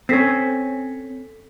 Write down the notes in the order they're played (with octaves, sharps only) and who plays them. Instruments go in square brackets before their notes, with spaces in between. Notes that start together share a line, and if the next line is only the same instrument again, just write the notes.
[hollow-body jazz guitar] C4 C#4 [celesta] A4 B6 C7